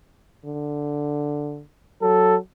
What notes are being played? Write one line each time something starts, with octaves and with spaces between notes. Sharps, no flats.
D3
F#3 A4